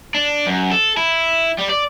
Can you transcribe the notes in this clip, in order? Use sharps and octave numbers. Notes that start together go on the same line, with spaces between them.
D4
F#2
A4
E4
G3
D5